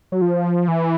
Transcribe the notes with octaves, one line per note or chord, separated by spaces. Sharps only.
F#3
F3
E3